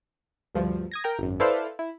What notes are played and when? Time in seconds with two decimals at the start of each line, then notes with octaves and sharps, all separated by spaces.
0.55 D2 G2 F3
0.92 D#6 G#6 A#6
1.04 A#4 G5 A#5
1.19 G#1 F#2
1.40 E4 A4 B4 C5 D5 F5
1.79 E4